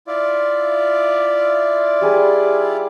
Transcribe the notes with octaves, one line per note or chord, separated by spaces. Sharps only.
E4 F4 D5
G3 G#4 D6